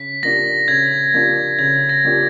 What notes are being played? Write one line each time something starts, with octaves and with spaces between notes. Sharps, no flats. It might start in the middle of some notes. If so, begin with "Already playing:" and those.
Already playing: C#3 B6
F3 A#3 D4 G4 A#6
C#3 G#6
F3 A#3 D4 G4
C#3 G#6
A#6
F3 A#3 D4 G4